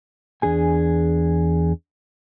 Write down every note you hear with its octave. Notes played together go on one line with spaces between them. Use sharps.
E2 D4 G#4 G#5